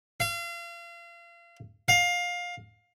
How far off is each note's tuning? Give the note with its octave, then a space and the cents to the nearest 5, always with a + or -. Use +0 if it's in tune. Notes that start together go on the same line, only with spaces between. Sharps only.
F5 -35
F5 +20